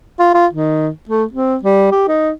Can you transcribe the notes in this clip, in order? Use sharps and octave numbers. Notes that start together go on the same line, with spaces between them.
F4
F4
D#3
A3
C4
G3
G4
D#4